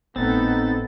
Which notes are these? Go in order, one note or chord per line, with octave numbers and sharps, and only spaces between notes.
G#1 A2 B3 C4 D#4 A4 A6